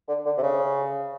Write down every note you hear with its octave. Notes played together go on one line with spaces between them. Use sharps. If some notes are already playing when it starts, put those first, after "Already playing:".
D3
D3
C3
C#3